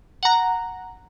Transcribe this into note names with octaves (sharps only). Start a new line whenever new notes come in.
F#5 A#5